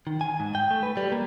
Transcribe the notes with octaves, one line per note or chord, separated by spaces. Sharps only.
D#3
G#5
G#2
G5
A3
B4
G3
A#3